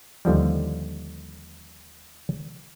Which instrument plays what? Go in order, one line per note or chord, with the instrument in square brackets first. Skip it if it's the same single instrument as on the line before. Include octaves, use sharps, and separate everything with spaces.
[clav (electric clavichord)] D#2 D3 F3 G3